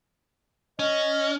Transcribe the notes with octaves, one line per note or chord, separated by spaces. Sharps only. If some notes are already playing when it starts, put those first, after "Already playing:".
C#4 D#5